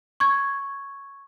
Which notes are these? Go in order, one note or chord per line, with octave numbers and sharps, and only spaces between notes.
C#6 G#6